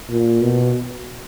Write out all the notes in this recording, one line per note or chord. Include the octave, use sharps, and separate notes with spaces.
A#2
B2